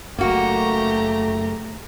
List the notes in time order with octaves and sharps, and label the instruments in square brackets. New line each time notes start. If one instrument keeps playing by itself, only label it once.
[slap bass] F#1 F#2 [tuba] A3 [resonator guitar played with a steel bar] A#3 F#4 [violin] G4 A#5